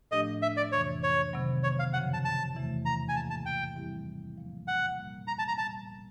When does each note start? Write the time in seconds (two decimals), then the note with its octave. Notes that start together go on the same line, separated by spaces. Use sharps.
0.11 A2 F3 A3 D4 G4 D#5
0.42 E5
0.57 D5
0.72 F2 C3 E3 C#5
1.03 C#5
1.33 C3 D#3 F#3 B3
1.63 C#5
1.79 F5
1.93 F#2 C#3 F3 F#5
2.14 A5
2.25 A5
2.55 E2 C3 E3 A3
2.85 A#5
3.09 G#5
3.15 G#2 F3 A#3 A5
3.30 A5
3.46 G5
3.76 E3 G3 C4 E4 G4
4.37 A2 F3 A#3
4.68 F#5
4.98 A#2 G3 A#3
5.27 A#5
5.39 A5
5.48 A#5
5.58 A#2 G3 B3 A5